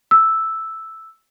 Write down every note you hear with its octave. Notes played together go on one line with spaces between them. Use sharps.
E6